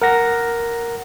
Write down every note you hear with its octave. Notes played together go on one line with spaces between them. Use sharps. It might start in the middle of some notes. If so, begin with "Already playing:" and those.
A#4 F#5 A#6